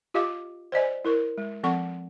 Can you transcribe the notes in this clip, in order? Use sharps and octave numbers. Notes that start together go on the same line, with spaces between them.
F4 G4 D#5 F5 D6
C5 D5 D#5 G#5
E4 A#4 C#6
G#3
F3 C4 A4 F#5 C#6